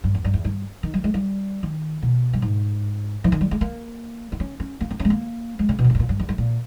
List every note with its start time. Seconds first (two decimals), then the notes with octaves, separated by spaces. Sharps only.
0.04 G2
0.15 E2
0.24 G2
0.34 E2
0.45 G2
0.83 D#3
0.94 G3
1.04 G#3
1.14 G3
1.63 D#3
2.02 B2
2.33 G2
2.42 G#2
3.24 E3
3.32 D#3
3.41 G3
3.51 G#3
3.61 A#3
4.32 B3
4.40 C#4
4.60 C#4
4.81 A#3
4.91 B3
5.00 C#4
5.05 G#3
5.10 A#3
5.59 G#3
5.69 C#3
5.79 B2
5.84 C#3
5.90 B2
5.95 G#2
5.99 A#2
6.09 G2
6.20 E2
6.29 G2
6.38 A#2